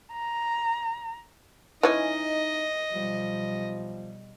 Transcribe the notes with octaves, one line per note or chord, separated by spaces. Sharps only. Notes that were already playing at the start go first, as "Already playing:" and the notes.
A#5
E3 C#4 D#4 D#5
B1 F3 G3